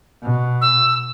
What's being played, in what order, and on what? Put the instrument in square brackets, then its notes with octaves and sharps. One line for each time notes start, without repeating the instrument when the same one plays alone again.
[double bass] B2
[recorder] E6